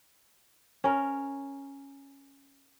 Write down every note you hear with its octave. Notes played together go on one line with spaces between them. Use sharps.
C#4 A#4